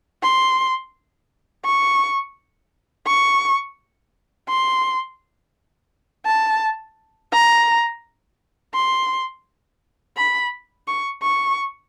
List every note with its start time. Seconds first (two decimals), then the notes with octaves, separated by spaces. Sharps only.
0.23 C6
1.65 C#6
3.07 C#6
4.49 C6
6.26 A5
7.33 A#5
8.74 C6
10.17 B5
10.88 C#6
11.23 C#6